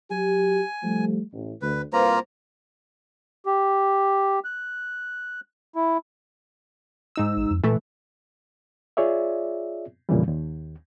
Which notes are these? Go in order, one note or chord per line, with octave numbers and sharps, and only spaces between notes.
F#3 G4 G#5
F3 G3 A3
A1
D2 B4
C2 A#3 F4 B4 C5 A#5
G4
F#6
E4
G#2 D#4 E6
A1
F2
A#2 E3 A3 E4
F4 G#4 C#5 D5 E5
F2 A#2 C#3 E3 G3
D#2